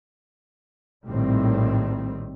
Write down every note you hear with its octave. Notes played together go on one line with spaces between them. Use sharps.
A#1 A2 D#3 G3 C4